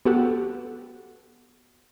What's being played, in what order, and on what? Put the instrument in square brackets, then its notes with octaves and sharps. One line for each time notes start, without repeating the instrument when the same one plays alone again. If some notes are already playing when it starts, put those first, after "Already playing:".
[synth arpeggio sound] B3 F#4 G4 A4 F#5